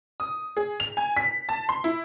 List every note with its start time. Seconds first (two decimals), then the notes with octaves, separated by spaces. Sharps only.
0.20 D#6
0.57 G#4
0.80 F7
0.97 G#5
1.17 B6
1.49 A5
1.69 C6
1.84 E4